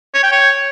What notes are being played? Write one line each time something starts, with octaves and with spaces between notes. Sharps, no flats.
C#5
G5
C#5